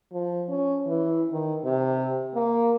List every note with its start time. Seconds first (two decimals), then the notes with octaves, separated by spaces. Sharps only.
0.12 F3
0.49 C#4
0.86 E3
1.32 D#3
1.64 C3
2.35 A#3